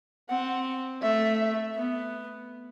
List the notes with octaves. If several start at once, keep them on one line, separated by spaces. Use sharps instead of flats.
C4 F#5
A3 E5
B3